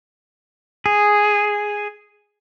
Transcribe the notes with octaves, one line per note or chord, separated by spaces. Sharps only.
G#4